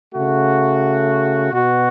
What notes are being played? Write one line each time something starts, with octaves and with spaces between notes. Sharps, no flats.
C#3 A3 F#4
B2 B3 F#4